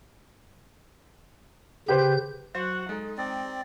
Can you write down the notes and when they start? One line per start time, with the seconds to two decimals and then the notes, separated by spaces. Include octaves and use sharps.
1.88 C#3 G4 B4 C5 G6
2.55 F#3 F#4 C5 F#5
2.89 G#3 D#4 A4
3.18 C4 D5 G5